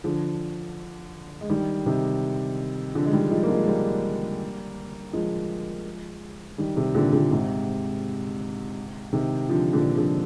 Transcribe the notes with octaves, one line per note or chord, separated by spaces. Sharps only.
D3 F3
G#3
D#3 G3
C3 D#3
D3 F3
G#3
D#3 G3
F3 G#3
A#3
F3 G#3
G3 A#3
F3 G#3
D#3 G3
C3 D#3
A#2 D3
A#2 D3
G#2 C3
C3 D#3
D3 F3
A#2 D3
D3 F3